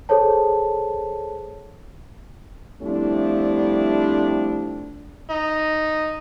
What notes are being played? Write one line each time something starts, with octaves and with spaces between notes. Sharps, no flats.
G#4 A4 C5 C#5 A5
F3 G3 A3 C4 D4 E4
D#4